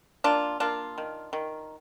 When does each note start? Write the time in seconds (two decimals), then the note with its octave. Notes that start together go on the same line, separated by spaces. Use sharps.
0.24 A#3 D4 F4
0.60 A#3 D4 F4
0.98 D#3
1.33 D#3